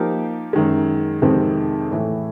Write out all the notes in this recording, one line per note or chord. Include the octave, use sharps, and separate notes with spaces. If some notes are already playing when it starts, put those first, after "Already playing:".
Already playing: F3 A#3 D#4 G4 A#4
F#2 D#3 G#3
F2 C3 D#3 G#3 C4
A2 E3 A3